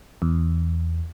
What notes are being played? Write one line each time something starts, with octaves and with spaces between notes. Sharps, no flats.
E2